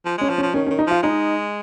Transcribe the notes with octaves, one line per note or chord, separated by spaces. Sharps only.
F3
G#3
C#4
F3
C#4
F3
D#3 C#4
C#4
D#3
D#4
F3 F4
G#3 D#4